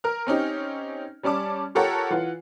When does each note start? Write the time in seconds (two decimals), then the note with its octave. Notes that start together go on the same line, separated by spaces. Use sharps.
0.04 A#4 F6
0.27 C4 C#4 D#4 G4
1.23 G3 C#4 D5 A5 D6
1.75 F4 G4 A4 A#4 C#5 F#5
2.10 E3 F4 F#5